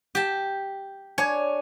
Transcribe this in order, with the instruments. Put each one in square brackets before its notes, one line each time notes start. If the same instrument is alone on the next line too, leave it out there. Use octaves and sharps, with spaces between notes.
[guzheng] G4 A5
[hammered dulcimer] D4 G#5 [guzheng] C#5